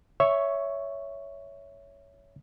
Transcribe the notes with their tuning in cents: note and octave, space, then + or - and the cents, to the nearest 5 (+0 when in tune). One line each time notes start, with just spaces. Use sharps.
C#5 +15 E5 +0 C#6 +0